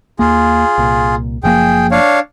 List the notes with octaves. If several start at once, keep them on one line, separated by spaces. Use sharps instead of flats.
D#2 A#3 F4 G#4
C2 A#2
F#1 F3 A#3 G#4 G5
D4 C#5 F5